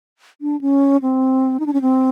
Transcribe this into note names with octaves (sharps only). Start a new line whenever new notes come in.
D4
C#4
C4
D#4
D4
C#4
C4